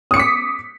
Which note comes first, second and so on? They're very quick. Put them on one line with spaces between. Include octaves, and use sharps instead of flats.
D#6 C#7 D6 B6